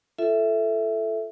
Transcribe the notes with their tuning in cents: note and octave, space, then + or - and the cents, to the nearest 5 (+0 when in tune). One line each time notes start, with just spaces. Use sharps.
F4 -40 A4 +0 E5 +0